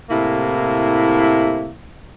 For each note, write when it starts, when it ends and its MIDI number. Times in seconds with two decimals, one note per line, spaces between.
0.10 1.73 45
0.10 1.73 48
0.10 1.73 58
0.10 1.73 64